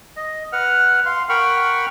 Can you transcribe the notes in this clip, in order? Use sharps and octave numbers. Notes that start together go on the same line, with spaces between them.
D#5
B4 F#5 F6
F5 C6
A#4 F#5 G5 B5 C#6 F6